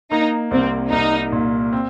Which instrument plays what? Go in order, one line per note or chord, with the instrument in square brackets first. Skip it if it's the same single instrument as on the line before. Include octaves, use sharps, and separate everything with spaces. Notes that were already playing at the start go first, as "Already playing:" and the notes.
[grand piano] A#3 [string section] D#4
[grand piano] C2 [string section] C4
[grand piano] C2 [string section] D#4
[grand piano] A#2
C4